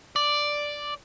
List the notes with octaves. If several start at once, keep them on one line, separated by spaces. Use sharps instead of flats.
D5